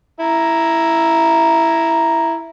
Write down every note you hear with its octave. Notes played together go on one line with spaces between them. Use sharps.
E4 A#5